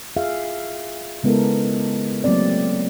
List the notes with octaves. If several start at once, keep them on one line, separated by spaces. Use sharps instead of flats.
F4 G#4 E5 F5
C#3 G#3 B3 E4 A4 A#4
F#3 A3 A#3 C4 D5